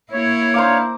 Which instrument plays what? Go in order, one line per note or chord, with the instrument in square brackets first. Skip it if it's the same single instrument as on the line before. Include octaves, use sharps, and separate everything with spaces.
[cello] A#3 E4 [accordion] C#5
[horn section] D4 F5 [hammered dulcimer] C5 A#5 D6